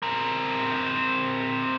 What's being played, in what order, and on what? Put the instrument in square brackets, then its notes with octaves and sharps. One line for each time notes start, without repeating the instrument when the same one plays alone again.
[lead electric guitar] C4 A#4